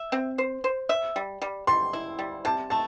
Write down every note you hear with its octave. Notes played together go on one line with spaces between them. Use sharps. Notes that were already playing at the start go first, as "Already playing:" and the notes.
Already playing: E5
C4
C5
C5
E5
G3
G3
G3 C6
E4
G3
C3 A5
A3 A5